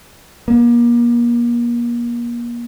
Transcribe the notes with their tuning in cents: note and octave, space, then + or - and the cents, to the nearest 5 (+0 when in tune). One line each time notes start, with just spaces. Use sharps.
A#3 +35